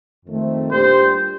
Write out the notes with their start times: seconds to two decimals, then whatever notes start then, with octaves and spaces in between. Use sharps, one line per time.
0.25 F2 D#3 A3 C4
0.70 A#2 G3 D4 G4 C5